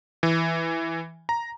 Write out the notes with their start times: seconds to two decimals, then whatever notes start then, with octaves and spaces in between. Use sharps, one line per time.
0.23 E3
1.29 A#5